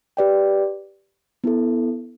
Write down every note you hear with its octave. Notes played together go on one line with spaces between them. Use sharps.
G4 B4 D5 G5
B3 E4 A4